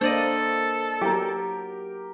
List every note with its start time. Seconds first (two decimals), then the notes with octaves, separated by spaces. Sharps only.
0.01 A#3 D4 A4 A#4 C5 D5 D#5
1.01 F#3 G4 A#4